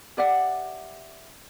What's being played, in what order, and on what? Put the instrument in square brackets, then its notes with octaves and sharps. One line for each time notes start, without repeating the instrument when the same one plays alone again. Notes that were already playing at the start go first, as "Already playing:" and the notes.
[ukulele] G4 D5 E5 F#5